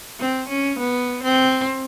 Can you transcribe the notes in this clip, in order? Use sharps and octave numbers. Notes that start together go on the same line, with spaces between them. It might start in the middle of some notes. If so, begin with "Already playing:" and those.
C4
C#4
B3
C4